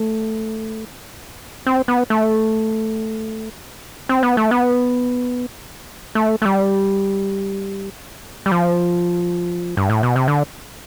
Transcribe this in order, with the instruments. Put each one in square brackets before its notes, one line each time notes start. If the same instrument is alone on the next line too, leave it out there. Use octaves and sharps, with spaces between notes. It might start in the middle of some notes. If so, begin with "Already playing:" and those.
Already playing: [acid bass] A3
C4
B3
A3
C4
B3
A3
B3
A3
A3
G3
G3
F3
G2
A2
B2
C3
D3